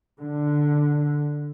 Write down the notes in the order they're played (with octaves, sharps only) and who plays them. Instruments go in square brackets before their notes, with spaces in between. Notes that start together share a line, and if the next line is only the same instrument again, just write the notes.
[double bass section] D3